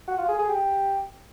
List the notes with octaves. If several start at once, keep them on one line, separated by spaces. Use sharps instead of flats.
F#4
F4
G#4
G#4
G4